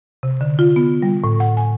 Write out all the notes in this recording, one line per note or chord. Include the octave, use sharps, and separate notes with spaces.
C3
D3
F4
B3
G3
A2
F#5
G#5